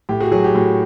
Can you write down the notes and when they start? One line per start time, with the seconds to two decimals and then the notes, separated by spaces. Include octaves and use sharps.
0.09 A2 G4
0.20 F#4 G#4
0.32 F#3 F#4 G#4
0.44 G4
0.55 A2 F#4